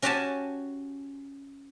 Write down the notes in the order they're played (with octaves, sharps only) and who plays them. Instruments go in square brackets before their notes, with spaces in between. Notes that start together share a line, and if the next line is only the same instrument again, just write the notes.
[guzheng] C#4 F#4 G4 C#5 G#5 A5